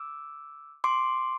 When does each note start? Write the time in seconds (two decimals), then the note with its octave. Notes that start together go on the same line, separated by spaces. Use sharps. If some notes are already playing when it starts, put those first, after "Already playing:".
Already playing: D6 E6
0.84 C6 D6